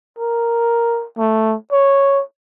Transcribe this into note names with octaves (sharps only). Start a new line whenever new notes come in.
A#4
A3
C#5